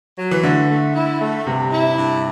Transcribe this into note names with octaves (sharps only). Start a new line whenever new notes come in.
F#3
E3
D3 A3
A3
E4
A3
G2 C3
E4
G2